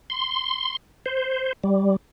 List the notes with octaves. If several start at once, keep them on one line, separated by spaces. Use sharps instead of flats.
C6
C5
G3